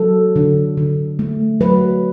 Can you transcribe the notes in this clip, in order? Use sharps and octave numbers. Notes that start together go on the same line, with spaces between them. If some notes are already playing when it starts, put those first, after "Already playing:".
Already playing: F#3 A4
D3
D3
A3
F#3 B4